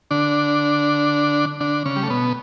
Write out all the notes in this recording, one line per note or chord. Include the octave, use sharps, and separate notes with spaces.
D3 D4
D3 D4
C#3 C#4
G3
A3
B2 B3